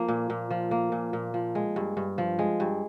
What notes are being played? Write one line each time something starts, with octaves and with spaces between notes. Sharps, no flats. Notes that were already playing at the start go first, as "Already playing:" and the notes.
Already playing: F3 A#3
A#2
A#2
F3
A#3
A#2
A#2
F3
G#3
G2
G2
F3
G#3
G2